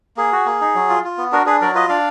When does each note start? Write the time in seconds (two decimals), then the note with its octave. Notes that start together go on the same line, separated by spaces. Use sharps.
0.17 A#3 G#4
0.32 F#4
0.46 A#3
0.61 D#4
0.75 F#3
0.89 F4
1.04 F4
1.18 B3
1.32 D4 F#4 A#4
1.46 D4 G#4 B4
1.61 F#3 A#4 D5
1.75 F4 B4 D#5
1.89 D4 D5 F5